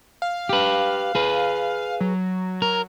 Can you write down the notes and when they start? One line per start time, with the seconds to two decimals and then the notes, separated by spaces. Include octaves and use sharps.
0.22 F5
0.49 G4 B4
1.15 G#4 B4
2.01 F#3
2.62 A#4